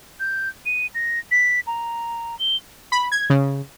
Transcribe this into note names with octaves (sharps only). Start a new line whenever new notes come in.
G6
D#7
A#6
B6
A#5
G7
B5
G#6
C#3